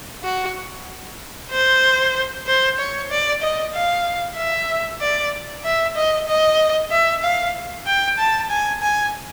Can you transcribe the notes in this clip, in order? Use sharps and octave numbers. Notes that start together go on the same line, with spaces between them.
F#4
C5
C5
C#5
D5
D#5
F5
E5
D5
E5
D#5
D#5
E5
F5
G5
A5
G#5
G#5